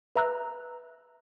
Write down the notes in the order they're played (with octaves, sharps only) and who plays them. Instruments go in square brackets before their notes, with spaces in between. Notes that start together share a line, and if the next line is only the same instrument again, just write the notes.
[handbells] B4 E5 A#5 E6 F#6